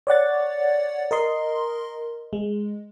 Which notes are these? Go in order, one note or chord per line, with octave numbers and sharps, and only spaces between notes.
C#5 D5 F#5 A6
A#4 D#5 C6
G#3